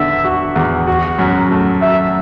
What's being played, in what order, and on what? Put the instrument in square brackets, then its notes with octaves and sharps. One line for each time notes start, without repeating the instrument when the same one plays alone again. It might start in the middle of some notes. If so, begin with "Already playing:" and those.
Already playing: [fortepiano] E2 D3 B3 [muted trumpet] E5
[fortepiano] F#4
E2
F#4
F#2
A3
[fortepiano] F#3 [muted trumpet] E5